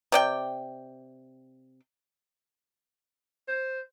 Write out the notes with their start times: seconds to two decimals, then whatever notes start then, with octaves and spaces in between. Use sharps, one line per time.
0.12 C3 D5 G5
3.48 C5